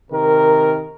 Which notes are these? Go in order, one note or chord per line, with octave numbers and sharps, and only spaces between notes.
C3 D#3 A#4